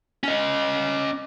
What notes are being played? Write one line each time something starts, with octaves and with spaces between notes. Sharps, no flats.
C#4 D#5